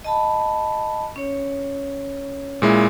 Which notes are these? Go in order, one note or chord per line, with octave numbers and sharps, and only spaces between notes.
D#5 A5 B5
C#4 C#5
A#2 G#3 E4